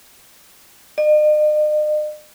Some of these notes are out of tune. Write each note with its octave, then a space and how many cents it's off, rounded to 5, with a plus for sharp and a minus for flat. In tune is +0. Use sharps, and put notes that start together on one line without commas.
D#5 -45